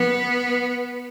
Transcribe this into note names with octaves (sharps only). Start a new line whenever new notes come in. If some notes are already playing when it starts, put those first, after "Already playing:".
Already playing: B3